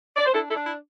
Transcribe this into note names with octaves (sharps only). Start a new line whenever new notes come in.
D5
C5
D4 E4 A4
E4 A4
D4
E4